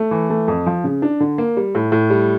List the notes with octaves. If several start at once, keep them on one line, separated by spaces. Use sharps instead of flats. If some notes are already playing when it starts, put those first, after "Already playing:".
Already playing: A3
E3
A3
F2
F3
C#3
D4
D3
A#3
G3
A2
A2
G3